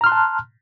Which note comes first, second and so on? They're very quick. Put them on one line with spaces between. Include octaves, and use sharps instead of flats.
A#5 F6 C6 F#6 A5